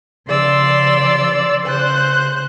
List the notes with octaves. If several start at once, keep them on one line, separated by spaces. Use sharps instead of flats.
C#3 F3 D5 C6 E6
C#3 C5 F#6